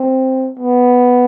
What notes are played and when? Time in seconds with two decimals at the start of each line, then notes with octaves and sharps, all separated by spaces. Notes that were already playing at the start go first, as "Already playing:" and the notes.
Already playing: C4
0.59 B3